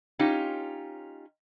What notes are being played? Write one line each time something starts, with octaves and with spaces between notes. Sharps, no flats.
C#4 D#4 F4 G4